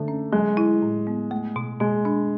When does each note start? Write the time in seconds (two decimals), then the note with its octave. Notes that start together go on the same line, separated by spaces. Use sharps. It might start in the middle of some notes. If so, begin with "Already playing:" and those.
Already playing: D3 A3 D4
0.08 C#4
0.32 F#3 G#3
0.57 E4
0.82 A2
1.07 B3
1.31 A3
1.56 B2
1.81 B2 G#3
2.05 D4